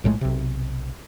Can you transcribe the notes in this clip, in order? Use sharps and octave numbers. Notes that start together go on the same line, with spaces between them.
A#1 A2 G#3 A3
B1 C3